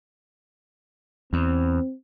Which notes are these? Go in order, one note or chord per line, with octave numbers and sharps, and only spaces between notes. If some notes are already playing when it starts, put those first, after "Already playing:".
E2 C4